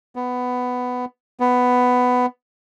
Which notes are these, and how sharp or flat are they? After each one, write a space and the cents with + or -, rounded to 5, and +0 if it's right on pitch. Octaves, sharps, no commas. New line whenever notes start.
B3 +10
B3 +10